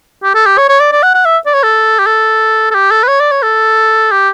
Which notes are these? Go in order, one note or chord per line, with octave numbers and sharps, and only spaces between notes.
G4
A4
G4
C#5
C#5
D5
D5
F#5
F#5
E5
D5
C#5
A4
G4
A4
A4
G4
A4
B4
C#5
D5
C#5
A4
G4